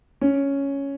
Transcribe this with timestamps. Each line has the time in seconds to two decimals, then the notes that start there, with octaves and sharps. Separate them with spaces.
0.21 C#4